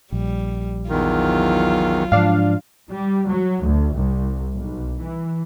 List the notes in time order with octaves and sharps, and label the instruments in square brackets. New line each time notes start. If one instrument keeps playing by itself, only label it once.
[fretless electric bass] A#1 [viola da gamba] G3
[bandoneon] E2 D#3 [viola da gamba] F#3 F4
[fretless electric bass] G#2 F3 [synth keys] D4 F5
[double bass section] G3
F#3
D2
C2
B1
E3